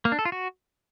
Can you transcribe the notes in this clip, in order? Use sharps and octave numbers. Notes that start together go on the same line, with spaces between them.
A#3
D4
A4
F4
F#4